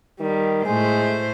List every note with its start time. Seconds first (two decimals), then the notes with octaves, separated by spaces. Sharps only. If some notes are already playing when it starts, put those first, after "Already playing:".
0.20 D#3 G3
0.65 A2 G#3 A3 C5